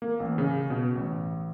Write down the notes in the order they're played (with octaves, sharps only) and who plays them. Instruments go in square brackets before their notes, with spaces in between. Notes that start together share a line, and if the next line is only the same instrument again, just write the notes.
[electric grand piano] A#3
A1
C#3
B2
A1